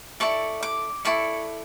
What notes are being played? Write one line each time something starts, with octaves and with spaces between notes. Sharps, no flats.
E4 A4 D5 C#6
D6
E4 A4 D5 C#6